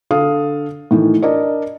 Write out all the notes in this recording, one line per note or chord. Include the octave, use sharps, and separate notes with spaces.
D3 A4 F5 D#6
A2 D#3 E3
D4 A#4 D5 D#5